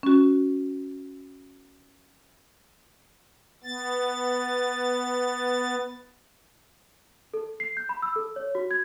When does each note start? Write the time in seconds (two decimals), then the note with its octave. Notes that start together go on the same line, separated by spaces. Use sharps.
0.03 C#4 F#4
3.64 B3 A6
7.34 A4
7.60 C7
7.77 G6
7.89 B5
8.02 E6
8.16 A4
8.36 C#5
8.55 F#4
8.71 G#6